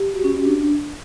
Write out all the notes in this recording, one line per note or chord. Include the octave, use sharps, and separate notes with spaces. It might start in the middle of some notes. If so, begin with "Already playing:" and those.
Already playing: G4
F#4
C#4
C#4
D4